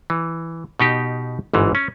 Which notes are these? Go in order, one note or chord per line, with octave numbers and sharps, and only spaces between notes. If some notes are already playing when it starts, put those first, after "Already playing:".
E3
B2 D#4 G4
G1 G#2 E3
C#4